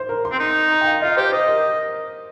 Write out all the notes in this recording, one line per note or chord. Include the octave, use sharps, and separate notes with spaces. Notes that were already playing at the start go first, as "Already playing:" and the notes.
Already playing: C5
A#4
C6
C4
D#4
A#5
G5
F5
F4 D#5
G4 C5
C5 D#5
A#4